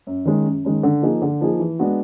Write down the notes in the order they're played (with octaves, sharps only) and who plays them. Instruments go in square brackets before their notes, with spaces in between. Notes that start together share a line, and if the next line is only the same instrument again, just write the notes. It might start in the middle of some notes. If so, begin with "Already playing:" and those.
[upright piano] F#2
D#3 G#3 C#4
F#2
D#3 G#3 C#4
D3
F3 A#3 D#4 G#4
D3
F3 A#3 D#4 G#4
E3
G#3 B3 D4 F#4